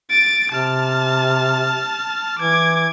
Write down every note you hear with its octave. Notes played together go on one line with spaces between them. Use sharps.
A6 D7
C3 A5 F6
E3 D6 G#6